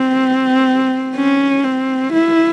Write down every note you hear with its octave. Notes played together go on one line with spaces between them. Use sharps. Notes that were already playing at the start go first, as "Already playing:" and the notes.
Already playing: C4
C#4
C4
E4